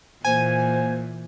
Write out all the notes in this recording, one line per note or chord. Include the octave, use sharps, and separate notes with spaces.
A#2 E3 A#3 C5 G#5